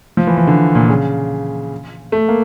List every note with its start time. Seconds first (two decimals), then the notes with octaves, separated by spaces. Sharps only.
0.17 F3
0.27 E3
0.38 E3
0.47 D3
0.75 A#2
0.89 C#3
2.12 A3
2.29 A#3